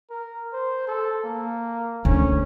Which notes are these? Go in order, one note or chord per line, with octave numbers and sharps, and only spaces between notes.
A#4
C5
A4
A#3
D2 C#4